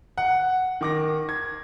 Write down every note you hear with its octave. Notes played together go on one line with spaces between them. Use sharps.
F#5
D#3 D6 A#6
G#6